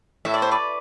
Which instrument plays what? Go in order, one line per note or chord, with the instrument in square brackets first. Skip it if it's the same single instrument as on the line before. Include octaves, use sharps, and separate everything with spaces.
[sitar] A2 [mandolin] E5
[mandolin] D5
C5
B4 D5